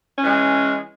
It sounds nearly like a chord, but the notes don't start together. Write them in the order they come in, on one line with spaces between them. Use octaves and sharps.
C#4 E3 G#3